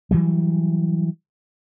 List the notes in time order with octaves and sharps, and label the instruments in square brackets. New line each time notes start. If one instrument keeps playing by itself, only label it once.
[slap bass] E3 F#3 G3